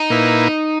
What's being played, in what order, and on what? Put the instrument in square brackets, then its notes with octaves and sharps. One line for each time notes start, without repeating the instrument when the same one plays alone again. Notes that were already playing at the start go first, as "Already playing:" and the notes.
Already playing: [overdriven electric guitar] D#4
[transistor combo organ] A#2 A#3 E4 B4